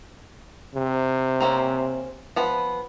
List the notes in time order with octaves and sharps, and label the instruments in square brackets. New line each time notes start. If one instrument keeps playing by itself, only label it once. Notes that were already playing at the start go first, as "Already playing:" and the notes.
[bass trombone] C3
[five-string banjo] A#3 C4 C#4
F3 B3 B4